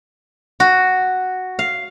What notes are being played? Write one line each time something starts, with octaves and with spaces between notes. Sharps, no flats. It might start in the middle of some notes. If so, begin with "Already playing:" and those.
F#4
F5